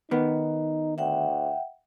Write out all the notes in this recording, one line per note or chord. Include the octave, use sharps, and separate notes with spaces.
D#3 B3 D#4
D2 E5 F#5 G5